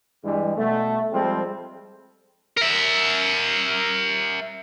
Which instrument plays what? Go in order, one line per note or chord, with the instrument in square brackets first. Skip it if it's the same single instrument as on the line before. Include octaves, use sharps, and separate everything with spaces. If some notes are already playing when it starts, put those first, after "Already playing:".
[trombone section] G2 E3 G3 G#3
B2 A3
F3 G3 G#3 C4 A4
[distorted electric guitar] A#4 E5